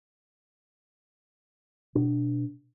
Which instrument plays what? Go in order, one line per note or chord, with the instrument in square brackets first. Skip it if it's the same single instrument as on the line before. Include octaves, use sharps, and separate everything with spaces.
[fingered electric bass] B2 D4